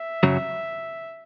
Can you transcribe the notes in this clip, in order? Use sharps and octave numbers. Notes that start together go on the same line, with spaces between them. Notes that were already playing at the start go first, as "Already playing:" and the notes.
Already playing: E5
F#2 C#3 F#3